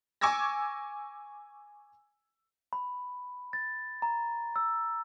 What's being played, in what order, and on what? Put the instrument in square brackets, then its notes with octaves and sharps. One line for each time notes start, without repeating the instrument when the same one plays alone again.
[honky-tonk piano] G#5 C#6 D6 E6 G#6 A#6
[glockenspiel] B5
A6
A#5
E6